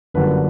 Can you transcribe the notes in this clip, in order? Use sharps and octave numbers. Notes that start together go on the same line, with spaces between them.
G1 F#2 D3 G3 A#3 B4